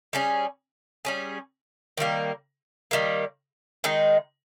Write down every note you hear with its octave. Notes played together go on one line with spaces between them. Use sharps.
G3 C#4 G#4
G3 C#4 G#4
D#3 G3 A#3
D#3 G3 A#3
D#3 G#3 D#4